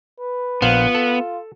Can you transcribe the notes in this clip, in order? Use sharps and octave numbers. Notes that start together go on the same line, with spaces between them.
B4
A#1 B3 F4 C5 F5
A4